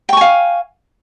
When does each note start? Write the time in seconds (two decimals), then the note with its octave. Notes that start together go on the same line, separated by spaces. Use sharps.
0.09 G5
0.13 C#6
0.17 G#5
0.21 F5